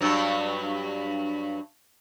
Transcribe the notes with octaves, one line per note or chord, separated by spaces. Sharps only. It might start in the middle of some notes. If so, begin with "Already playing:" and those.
G2 F#3